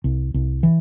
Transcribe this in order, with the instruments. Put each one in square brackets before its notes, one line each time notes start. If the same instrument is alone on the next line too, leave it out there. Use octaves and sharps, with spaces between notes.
[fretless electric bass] C2
C2
E3